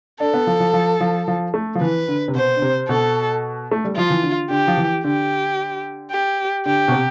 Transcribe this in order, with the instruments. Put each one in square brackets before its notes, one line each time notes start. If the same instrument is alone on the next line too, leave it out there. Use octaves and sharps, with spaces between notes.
[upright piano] D4 [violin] A4
[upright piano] B3
F3
F3
F3
F3
F3
A3
F3
[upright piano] E3 [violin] B4
[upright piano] D3
C3
[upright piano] B2 [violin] C5
[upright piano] D3
C3
[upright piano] B2 [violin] A4
[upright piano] A3
G3
[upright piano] F3 [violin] F4
[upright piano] E3
D3
[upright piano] D3 [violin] G4
[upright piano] F3
E3
[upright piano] D3 [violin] G4
[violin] G4
[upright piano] D3 [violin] G4
[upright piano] B2
C3